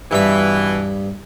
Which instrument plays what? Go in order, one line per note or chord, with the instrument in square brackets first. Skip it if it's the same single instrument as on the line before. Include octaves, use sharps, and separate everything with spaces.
[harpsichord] G2 B5 [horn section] B2 E3